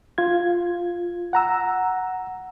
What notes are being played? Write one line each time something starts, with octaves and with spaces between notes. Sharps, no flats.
F4 G#6
F#5 A#5 E6